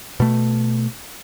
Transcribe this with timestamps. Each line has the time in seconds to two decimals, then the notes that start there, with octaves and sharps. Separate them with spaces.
0.20 B2 A3